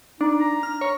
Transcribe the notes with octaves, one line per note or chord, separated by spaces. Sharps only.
D4 D#4
A#5
F6
C#5